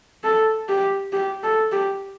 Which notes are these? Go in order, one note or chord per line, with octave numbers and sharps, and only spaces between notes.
A4
G4
G4
A4
G4